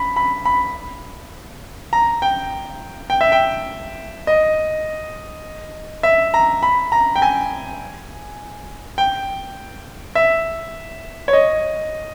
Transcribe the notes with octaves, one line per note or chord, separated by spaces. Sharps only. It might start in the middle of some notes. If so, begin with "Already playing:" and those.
Already playing: B5
B5
B5
A#5
G5
G5
E5
G5
D#5
E5
A#5
B5
A#5
G5
G#5
G5
E5
C#5
D#5